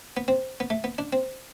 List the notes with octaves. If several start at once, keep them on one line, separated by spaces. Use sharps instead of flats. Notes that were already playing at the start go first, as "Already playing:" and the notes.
B3
C4
B3
A3
B3
D4
C4